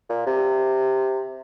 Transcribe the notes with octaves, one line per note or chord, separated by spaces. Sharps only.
A#2
C3